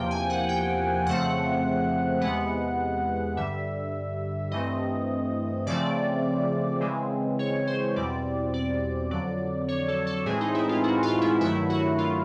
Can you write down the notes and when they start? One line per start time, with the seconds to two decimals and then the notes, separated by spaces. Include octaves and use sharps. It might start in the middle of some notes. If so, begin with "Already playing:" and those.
Already playing: E2 C3 F3 A#3 G5
0.11 G#5
0.30 F#5
0.49 G5
1.06 F2 C#3 F3 A3 C4 F#5
2.21 E2 C3 E3 G#3 B3 F#5
3.36 G2 D3 G3 E5
4.51 G2 E3 A3 C4 D#5
5.66 C#3 F3 A3 C4 D5
6.81 C#3 E3 G#3 C4
7.39 C#5
7.67 C5
7.96 E2 B2 G3 C4 D5
8.54 D5
9.11 F2 D3 F#3 D5
9.68 C#5
9.88 A4
10.07 A4
10.26 A2 E3 G#3 C4 G#4
10.41 D#4
10.54 E4
10.69 F4
10.84 F#4
11.03 F4
11.21 E4
11.41 G2 D#3 F#3 A3 E4
11.70 F#4
11.98 F4